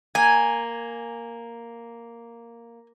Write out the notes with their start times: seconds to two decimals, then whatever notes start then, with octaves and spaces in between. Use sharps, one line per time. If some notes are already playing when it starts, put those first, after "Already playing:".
0.15 A#3 G#5